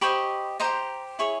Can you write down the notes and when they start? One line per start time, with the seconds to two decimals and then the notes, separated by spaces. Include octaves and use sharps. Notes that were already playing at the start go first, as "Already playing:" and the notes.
0.01 G4 C5 D#5 B5 C#6
0.60 G4 C5 D#5 A#5 C6
1.19 E4 G#4 C#5 C#6